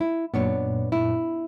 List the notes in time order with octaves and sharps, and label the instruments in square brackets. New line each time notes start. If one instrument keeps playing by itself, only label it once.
[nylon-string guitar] E4
[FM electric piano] F#2 A#2 [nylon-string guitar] B3 D4 C#5
[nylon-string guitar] E4